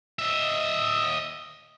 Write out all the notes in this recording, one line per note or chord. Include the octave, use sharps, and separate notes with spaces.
D#5 E5